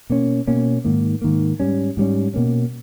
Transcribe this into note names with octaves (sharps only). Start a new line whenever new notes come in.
B2 A#3 C#4
B2 A#3 C#4
G#2 D#3 A#3
G#2 D#3 A#3
G#2 G3 C#4
G#2 G3 C#4
B2 A#3 C#4